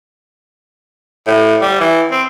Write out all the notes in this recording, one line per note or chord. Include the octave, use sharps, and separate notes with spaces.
A2
G3
E3
C4